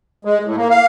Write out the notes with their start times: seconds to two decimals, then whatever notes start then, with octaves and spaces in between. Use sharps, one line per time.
0.25 G#3
0.45 A2
0.56 A#3
0.70 F5